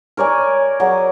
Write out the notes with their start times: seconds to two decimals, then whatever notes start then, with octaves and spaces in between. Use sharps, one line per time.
0.17 A#4 C#5 D5 G#5
0.80 F#3 G#4 A#4 D5